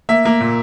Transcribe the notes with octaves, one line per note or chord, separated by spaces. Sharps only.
A#3 E5
A#3
A#2